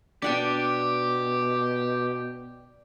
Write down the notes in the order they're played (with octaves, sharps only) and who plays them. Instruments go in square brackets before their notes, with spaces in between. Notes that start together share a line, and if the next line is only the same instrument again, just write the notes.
[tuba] B2 [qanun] D4 F#5 A5 [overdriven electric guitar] G4 [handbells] D5 G5 D6